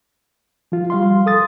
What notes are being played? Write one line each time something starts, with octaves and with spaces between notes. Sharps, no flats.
F3 F4
G3 F5 C6
A4 D#6 A6